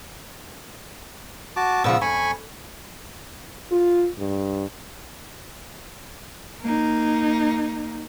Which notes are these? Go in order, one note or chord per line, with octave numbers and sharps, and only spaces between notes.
F#4 A5 D6
A#2 C#3 F3 B3 E6
F2 G#5 B5 C#6
F4
G2
A#3 D#4